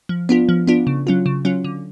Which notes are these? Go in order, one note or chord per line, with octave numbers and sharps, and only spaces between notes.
F3
B3 D4 F4
F3
B3 D4 F4
C#3
F#3 C#4 F4
C#3
F#3 C#4 F4
D3